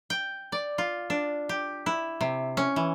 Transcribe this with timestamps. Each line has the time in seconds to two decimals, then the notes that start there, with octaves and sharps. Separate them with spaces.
0.10 G5
0.52 D5
0.78 F4
1.10 D4
1.49 G4
1.86 E4
2.21 C3
2.57 C#4
2.76 E3